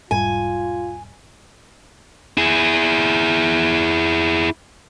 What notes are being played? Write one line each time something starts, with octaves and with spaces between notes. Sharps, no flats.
E1 G#2 G3 F4 G#5
E4 G#4